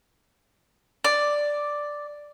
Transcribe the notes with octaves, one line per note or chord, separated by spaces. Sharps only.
D5